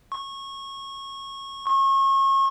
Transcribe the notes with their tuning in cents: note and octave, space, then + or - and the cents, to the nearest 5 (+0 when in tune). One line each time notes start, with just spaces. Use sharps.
C#6 -20
C#6 -35